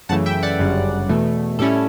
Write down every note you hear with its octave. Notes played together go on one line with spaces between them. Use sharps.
F#2 C#3 E3 A3 F#5 A5
E5 G5
D5 F#5
G1 F#2 C#3 G3
E2 B2 A3
A2 G3 C#4 E4 A4